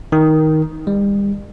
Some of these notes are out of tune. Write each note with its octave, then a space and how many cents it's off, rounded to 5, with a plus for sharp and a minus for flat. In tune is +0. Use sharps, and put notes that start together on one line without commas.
D#3 +10
G3 +40